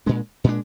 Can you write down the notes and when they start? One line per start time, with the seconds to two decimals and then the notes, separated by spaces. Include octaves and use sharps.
0.06 A#2 G#3 D4
0.44 A#2 G#3 D4